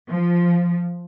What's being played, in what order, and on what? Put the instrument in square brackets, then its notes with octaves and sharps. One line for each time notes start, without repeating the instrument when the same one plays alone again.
[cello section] F3